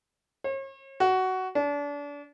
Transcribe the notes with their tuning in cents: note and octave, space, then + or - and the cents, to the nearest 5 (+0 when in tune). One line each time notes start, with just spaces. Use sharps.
C#5 -40
F#4 +15
D4 -30